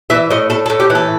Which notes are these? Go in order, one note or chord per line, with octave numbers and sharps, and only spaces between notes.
E3 E5
A2 D#5
A2 A4
A4
A2
G4
E3
A4